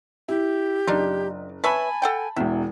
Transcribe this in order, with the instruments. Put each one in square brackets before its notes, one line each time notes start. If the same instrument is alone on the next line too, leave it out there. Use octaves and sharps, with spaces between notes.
[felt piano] E4 [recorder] G4
[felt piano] F#1 [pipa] D4 D#4 F4
[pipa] B4 C#5 E5 [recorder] G#5 [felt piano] A5 B5
[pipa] A4 F#5 G5
[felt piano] E1 E2 [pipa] E5